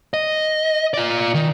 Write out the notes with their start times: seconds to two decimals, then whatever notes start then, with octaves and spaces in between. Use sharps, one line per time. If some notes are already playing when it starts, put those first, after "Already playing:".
0.14 D#5
0.94 F4 D5
1.34 D#3